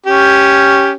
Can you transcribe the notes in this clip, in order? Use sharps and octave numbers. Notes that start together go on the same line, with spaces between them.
C#4 G4